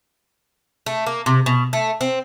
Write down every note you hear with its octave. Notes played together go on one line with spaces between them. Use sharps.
A3
A#3
C3
B2
A3
C4